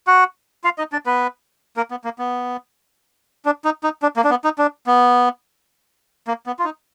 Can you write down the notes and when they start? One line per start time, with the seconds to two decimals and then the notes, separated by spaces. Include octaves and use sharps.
0.07 F#4 F#5
0.64 F4 F5
0.78 D#4 D#5
0.92 D4 D5
1.06 B3 B4
1.77 A#3 A#4
1.91 B3
2.04 A#3
2.19 B3
3.45 D4
3.65 D#4
3.83 D#4
4.02 D4
4.16 A#3
4.24 D4
4.30 B3
4.44 D#4
4.58 D4
4.87 B3
6.27 A#3
6.46 B3
6.59 F4
6.64 D#4